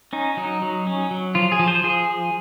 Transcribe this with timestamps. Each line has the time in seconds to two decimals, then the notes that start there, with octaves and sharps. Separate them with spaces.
0.13 C#4 D#4
0.37 F#3 D#4
0.62 F#3
0.87 C#4
1.11 F#3
1.35 F3 F4
1.52 G#4
1.59 F3
1.68 C5
1.84 F3 G#4